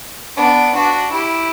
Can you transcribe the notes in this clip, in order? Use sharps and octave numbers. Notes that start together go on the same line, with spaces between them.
B3 D4
D4 F#4
E4 G4